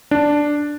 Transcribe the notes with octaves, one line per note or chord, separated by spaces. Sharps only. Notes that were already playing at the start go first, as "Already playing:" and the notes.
D4